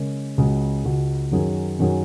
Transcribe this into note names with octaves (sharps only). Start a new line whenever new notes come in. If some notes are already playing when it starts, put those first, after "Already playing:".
Already playing: C#3 G#3 C#4 A#4
C#2 C#3 G#3 F#4
C#2 C#3 G#3 F#4
F#2 D#3 F#3 C#4 G#4
F#2 D#3 F#3 C#4 G#4